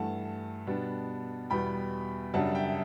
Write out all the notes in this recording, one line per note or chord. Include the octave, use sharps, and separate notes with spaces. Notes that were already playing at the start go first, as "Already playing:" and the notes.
Already playing: G2 E3 A3 F#5 A5
B2 G3 B3 D4
E2 B2 G3 B3 G5 B5
F#2 C#3 G3 D4 F#5 A5
E5 G5